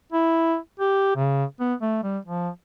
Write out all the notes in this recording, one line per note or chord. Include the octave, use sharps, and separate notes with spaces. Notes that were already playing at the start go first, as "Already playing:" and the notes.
E4
G4
C#3
B3
A3
G3
F3